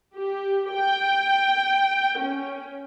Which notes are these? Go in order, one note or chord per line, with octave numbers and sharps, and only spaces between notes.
G4
G5
C#4